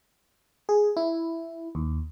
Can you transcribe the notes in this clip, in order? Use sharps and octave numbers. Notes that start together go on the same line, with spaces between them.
G#4
E4
D#2